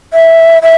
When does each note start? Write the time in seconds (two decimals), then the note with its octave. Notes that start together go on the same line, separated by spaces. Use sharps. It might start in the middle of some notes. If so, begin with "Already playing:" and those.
0.14 E5
0.62 E5